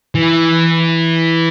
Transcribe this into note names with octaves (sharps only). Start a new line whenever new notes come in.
E3